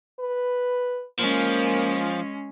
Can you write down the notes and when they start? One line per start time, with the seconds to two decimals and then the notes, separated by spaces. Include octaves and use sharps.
0.20 B4
1.19 F3 G#3 A#3 C#4